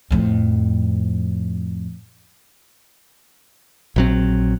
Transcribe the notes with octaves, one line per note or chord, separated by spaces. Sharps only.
F2 A2
A#1 F#3 C4